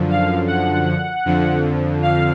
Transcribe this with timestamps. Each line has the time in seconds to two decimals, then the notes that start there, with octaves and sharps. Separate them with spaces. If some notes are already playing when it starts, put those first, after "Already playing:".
Already playing: F#2 D3 F3
0.10 F5
0.48 F#5
1.25 F2 D3 F3
2.02 F5